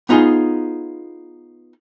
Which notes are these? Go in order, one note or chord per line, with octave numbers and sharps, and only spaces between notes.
B3 D#4 F4 G#4